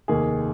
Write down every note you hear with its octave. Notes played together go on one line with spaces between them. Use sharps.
F1 D#2 D#3 A#3 G#4